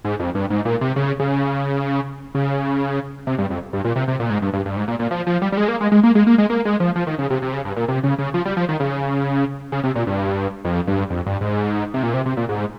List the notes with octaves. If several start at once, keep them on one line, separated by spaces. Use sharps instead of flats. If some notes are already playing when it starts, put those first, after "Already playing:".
G#2
F2
G2
G#2
A#2
C3
C#3
C#3
C#3
C3
G2
F2
G2
A#2
C3
C3
A#2
G#2
G2
G2
G2
G#2
A#2
A#2
F3
F3
G3
G3
G#3
A#3
G#3
G#3
A#3
G#3
A#3
G#3
A#3
G#3
F3
F3
D#3
C#3
C3
C3
C#3
G2
A#2
C3
C#3
C#3
F3
G3
F3
D#3
C#3
C#3
C3
A#2
G2
F2
G2
F2
G2
G#2
C3
A#2
C3
C3
A#2
G#2